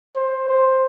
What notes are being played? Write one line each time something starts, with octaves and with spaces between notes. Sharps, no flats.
C5
C5